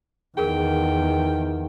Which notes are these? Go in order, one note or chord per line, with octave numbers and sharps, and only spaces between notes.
E2 D#3 G#4 A#4 G5